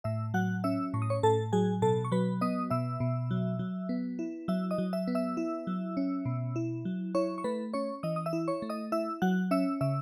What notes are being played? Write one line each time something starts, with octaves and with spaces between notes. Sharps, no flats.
A2 E5 E6
F#3 F#5 F#6
C#4 E5 E6
A2 C#6
D#6
C#5 C#6
A2 A4 A5
F#3 G#4 G#5
B2 A4 A5
C#6
F#3 B4 B5
B3 D#5 D#6
B2 E5 E6
B2
F#3
F#3
B3
E4
F#3 E5 E6
D#5 D#6
F#3
E5 E6
B3
E5 E6
E4
F#3
C#4
B2
E4
F#3
E4 C#5 C#6
C#6
A3 B4 B5
C#4 C#5 C#6
E3 D#5 D#6
D#6
E5 E6
E4
C#5 C#6
A3
D#5 D#6
E4 E5 E6
F#3 F#5 F#6
C#4 E5 E6
C#3 E5 E6